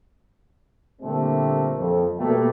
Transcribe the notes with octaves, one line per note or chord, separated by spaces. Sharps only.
A#2 D3 G3 A3 A#3 C4
F2
B2 G3 A3 A#3